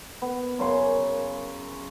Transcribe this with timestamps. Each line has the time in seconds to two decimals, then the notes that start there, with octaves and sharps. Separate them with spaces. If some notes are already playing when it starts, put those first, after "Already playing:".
0.22 B3
0.59 F#2 C#3 C#5 C6